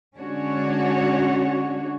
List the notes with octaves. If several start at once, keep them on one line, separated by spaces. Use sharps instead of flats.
D3 G#3 C#4 D4 F#4 C#5